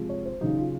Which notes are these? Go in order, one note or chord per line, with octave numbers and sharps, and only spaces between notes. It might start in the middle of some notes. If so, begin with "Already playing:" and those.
Already playing: C3 F3 G#3
C#5
C5
C#3 F#3 D#4
F4